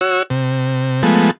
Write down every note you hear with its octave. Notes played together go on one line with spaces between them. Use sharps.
F#4 C#5 E6
C3
F3 G#3 A3 B3